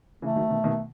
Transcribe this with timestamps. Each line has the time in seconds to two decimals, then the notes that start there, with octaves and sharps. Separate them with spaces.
0.22 C#3 E3 A3
0.36 D#3 F#3
0.50 B2 D#3
0.64 B2 D#3